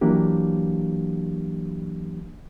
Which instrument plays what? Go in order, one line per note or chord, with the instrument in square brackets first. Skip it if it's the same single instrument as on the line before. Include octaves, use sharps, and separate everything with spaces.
[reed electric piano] E3 F#3 A#3 D4 G4